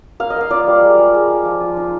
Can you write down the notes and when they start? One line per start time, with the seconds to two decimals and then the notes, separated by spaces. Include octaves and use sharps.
0.20 A#3 F5
0.30 D#5
0.36 A#3 F5
0.51 F4 D5
0.67 G3
0.82 G#3
0.98 G#3
1.15 G#3
1.30 G#3
1.45 F3
1.60 F4
1.77 D#4